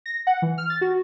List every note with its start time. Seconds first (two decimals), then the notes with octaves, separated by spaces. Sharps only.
0.06 A#6
0.27 F#5
0.42 E3
0.58 F6
0.70 A6
0.81 F#4